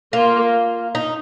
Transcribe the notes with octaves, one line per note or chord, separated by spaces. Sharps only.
A#3 F4
D#4